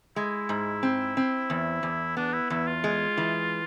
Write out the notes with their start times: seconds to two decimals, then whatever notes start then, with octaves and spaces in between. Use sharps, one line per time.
0.16 G#3 E4
0.49 G#2
0.83 C4
1.17 C4
1.50 E2
1.83 E2
2.17 B3 D4
2.33 E4
2.50 E2 E4
2.67 F4
2.84 G#3
3.17 E3